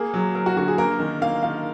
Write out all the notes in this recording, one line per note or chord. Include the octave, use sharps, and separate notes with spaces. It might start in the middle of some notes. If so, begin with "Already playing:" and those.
Already playing: A#3 G#4
F#3
F#3 A#4
F#4
D3 F#4
G#4
A#3 A#4
D#3
A#3 F5
D#3 F5